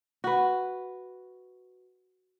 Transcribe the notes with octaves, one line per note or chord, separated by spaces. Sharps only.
F#4 B4